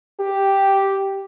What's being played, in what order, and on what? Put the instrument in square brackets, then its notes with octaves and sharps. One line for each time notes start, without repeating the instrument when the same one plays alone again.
[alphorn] G4